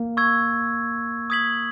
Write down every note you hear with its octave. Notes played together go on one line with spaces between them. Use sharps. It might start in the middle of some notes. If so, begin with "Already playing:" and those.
Already playing: A#3
C#6 E6 G#6
D#6 G#6 B6 F#7